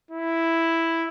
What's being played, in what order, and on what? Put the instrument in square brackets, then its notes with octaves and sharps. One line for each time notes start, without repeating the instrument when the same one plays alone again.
[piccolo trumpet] E4